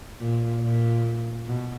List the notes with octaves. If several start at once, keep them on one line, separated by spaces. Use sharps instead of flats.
A#2
A#2
B2